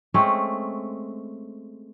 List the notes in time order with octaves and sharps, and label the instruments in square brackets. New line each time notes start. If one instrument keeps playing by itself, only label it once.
[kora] G#3 A3 C4 C#4